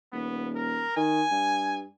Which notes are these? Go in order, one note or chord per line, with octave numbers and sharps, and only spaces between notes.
D#1 B3
A#4
D#3 G#5
G2